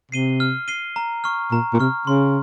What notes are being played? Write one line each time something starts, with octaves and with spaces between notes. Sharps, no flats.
C3 C7 D#7 G7
F6
C7 D#7 G7
A#5
C#6 F6
A#2 A#5
A#2
C3 C#6 F6
C#3 C6